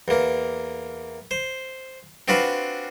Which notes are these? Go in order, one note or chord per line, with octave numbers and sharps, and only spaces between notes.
E2 A#3
C5
C4 D4 F4 F#4 B4